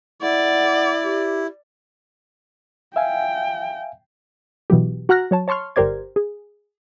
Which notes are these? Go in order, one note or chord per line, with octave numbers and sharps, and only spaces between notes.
E4 D5 F#5
G4
E5 F5 G5 G#5
B2 E3 F#3 G4
F#4 F#5 A#5 F6 F#6 A#6
F#3 C#5 A5
C#5 A5 C6 C#6 F6
G1 G4 A#4 C5 D5 G#6
G#4